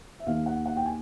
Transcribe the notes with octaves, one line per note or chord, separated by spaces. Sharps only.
E5
D#2 D#3 F5
F#5
F#5
G5
G#5